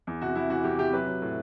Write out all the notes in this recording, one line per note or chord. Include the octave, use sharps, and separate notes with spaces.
E2
C3 F#4
E2 E4
E3 F#4
E2 G4
C3 G4
F#3 B4
F#3
A2